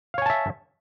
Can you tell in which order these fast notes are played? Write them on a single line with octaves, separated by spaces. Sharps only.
F5 C#5 G#5 A5 E5